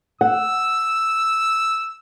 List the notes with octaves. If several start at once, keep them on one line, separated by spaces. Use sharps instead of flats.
F#5 E6